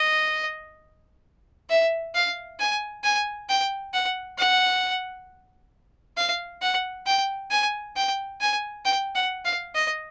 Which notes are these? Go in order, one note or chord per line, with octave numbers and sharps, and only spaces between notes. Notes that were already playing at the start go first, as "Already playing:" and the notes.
Already playing: D#5
E5
F5
G#5
G#5
G5
F#5
F#5
F5
F#5
G5
G#5
G5
G#5
G5
F#5
F5
D#5